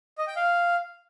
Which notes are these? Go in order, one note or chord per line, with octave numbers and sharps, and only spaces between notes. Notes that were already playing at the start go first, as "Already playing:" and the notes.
D#5
G5
F5